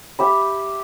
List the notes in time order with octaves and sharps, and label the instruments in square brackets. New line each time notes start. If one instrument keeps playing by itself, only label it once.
[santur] G4 E5 B5